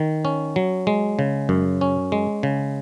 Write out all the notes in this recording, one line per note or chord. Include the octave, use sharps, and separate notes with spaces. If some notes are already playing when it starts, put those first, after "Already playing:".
Already playing: D#3
C#4
F#3
G#3
C#3
F#2
C#4
G#3
C#3